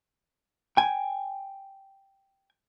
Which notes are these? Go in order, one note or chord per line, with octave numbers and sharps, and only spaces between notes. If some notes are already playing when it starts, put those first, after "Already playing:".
G5 G#5